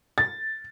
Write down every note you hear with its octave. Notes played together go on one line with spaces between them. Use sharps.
A6